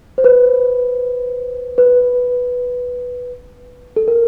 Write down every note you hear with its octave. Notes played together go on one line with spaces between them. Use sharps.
C5
B4
B4
A4
A#4